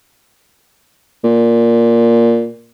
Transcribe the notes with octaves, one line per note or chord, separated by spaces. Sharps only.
A#2